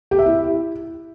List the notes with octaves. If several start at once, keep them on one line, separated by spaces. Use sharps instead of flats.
G4
E5
E4